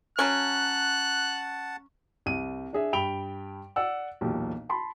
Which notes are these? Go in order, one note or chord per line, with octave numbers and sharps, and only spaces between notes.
F#3 C#4 F#5 A5 F#6
C2 D#7
D4 G#4 E5
G2 G5 B5 D7 F7 G7
D5 F#5 E6
E1 B1 A#2 G4
A5 B5 C6